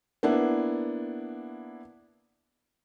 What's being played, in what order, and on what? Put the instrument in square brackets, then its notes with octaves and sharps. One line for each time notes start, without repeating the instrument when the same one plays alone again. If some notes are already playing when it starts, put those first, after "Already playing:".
[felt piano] A#3 B3 D4 E4